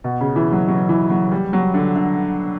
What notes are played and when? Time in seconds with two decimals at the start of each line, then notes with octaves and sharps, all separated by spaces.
0.04 B2
0.21 C#3
0.36 E3
0.52 F#3
0.68 F#3
0.89 E3
1.10 F#3
1.32 G3
1.53 F#3
1.74 D3
1.96 D3